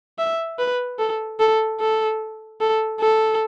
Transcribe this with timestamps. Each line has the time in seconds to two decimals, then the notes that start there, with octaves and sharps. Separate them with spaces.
0.19 E5
0.59 B4
0.99 A4
1.40 A4
1.80 A4
2.61 A4
3.00 A4